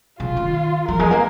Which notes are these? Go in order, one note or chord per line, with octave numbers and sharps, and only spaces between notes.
C#3 F4
D#3
F3 A#4
G#3
A#3